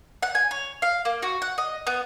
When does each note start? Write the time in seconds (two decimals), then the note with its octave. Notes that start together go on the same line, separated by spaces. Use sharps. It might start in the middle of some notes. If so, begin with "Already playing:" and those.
0.23 F#5
0.35 G#5
0.51 C#5
0.82 F5
1.05 A#3
1.22 F#4
1.42 F#5
1.58 D#5
1.87 B3